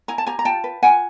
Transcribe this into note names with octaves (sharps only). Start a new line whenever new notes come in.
E4 G#5 A#5
A5
G4 G#5 A#5
A#5
F4 G5 A5
B4
F4 F#5 G#5